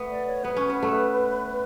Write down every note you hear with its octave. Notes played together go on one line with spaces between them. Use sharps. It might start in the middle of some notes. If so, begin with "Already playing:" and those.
Already playing: A3 B3
D5
C#5
B3 B4
C#4
B3
A3